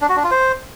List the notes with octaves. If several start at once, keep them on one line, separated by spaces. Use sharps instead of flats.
D4
F#4
D4
F4
C5